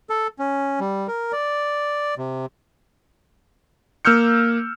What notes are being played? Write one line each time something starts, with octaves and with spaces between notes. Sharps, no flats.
A4
C#4
G3
A#4
D5
C3
A#3 E6 F6 G6 C#7